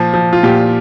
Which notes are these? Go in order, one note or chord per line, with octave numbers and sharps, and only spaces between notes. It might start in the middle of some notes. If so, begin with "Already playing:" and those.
Already playing: A#2 F3
F3
F4
A#2 G4